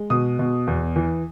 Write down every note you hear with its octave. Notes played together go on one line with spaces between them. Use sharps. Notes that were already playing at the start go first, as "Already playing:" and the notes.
Already playing: G#3
B2 D#6
B2
E2
E3